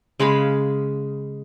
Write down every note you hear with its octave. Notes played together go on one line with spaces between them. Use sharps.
C#3 G#3 F5 B5